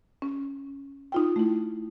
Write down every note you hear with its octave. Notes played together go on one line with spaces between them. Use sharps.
C#4
D#4 F4 G5
A3 E4